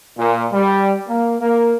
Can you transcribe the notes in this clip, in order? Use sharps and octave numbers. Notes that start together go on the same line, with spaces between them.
A#2
G3
A#3
A#3